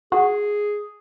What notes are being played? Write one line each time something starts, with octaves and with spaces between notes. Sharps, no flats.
F#4 G#4